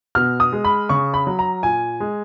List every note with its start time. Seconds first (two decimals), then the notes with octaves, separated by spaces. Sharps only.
0.15 B2 F6
0.40 D#6
0.53 G#3
0.65 B5
0.89 C#3 C#6
1.14 B5
1.27 F#3
1.39 A#5
1.63 A#2 G#5
2.00 G#3